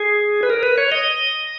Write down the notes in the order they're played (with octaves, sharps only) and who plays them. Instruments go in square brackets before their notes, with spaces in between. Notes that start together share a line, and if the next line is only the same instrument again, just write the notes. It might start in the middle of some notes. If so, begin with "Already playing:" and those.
Already playing: [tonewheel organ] G#4
B4
A#4
B4
C#5
D#5